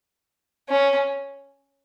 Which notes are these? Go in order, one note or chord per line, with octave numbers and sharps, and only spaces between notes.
C#4